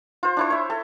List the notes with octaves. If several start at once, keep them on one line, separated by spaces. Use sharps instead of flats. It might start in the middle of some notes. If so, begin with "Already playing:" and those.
F4 C5
D4 E4 C5
C#5 E5
A4